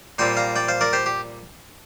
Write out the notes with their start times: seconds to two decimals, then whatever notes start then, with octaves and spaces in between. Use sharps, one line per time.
0.19 A#2 G3 C4 G5 C6
0.37 F5 A#5
0.56 D5 G5
0.68 C5 F5
0.81 A#4 D5
0.93 G4 C5
1.06 G4